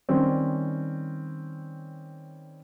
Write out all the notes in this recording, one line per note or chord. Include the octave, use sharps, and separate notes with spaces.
D#3 G3 C4 C#4